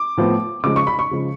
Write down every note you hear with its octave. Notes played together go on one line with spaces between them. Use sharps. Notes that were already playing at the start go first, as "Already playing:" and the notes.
Already playing: D6
A2 F3 B3
C#3 F3 G#3 D6
C#6
B5
C#6
C#3 F3 G#3